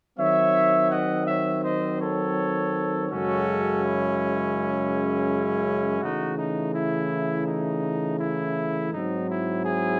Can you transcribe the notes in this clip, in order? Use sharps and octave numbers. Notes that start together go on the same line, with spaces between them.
D#3 F#3 C4 C#5 E5
D#5 F#5
C#5 E5
C5 D#5
A4 C#5
F#2 C#3 G#3 C#4 F#4 A4
E4
C#3 E3 A3 D#4 F#4
D#4
E4
D#4
E4
G#2 F#3 C4 D#4
E4
E4 G#4